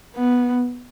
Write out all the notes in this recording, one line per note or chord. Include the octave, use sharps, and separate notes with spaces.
B3